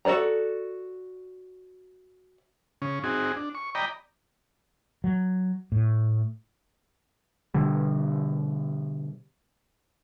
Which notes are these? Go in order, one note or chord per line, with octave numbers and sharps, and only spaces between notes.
F#4 A4 C5 D5 A#5
C#3 C#4
C4 D#4 F#4 G#4
D4
C#6
D5 D#5 G5 A#5 B5
F#3
A2
B2 D3 G3